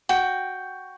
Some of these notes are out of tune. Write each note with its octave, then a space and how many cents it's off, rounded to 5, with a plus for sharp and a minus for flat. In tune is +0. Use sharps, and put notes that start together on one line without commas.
F#4 +5 G5 +0